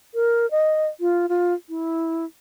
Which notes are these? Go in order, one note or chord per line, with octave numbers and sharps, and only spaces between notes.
A#4
D#5
F4
F4
E4